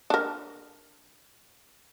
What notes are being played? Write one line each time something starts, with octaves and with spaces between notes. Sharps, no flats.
D4 A#4